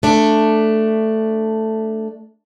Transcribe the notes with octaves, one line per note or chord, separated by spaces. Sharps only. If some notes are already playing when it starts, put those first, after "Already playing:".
A3 D4